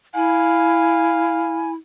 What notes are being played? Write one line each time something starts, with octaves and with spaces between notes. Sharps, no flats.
E4 F5 G#5